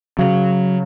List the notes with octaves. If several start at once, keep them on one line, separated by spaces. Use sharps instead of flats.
C#3 F#3